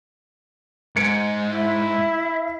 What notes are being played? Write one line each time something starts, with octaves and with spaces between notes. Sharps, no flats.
G#2 G#6 C#7 D7
E4 E5